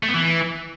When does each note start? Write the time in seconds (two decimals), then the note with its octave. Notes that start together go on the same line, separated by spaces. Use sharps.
0.03 A3
0.08 B3
0.14 E3